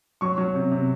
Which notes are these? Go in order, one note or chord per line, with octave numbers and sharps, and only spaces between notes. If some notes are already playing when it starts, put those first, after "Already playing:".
F#3 C#6
F#3
C3
C3